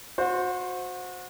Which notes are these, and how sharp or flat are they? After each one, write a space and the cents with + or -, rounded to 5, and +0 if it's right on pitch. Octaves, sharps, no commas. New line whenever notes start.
F#4 -30 C5 +0